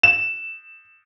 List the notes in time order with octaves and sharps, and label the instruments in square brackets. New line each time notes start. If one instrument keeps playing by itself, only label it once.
[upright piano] E7